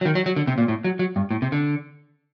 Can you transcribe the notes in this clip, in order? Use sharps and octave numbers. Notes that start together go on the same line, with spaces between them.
F#3
D#3
F#3
F#3
D3
C3
A#2
A2
F#3
F#3
G2
A2
C3
D3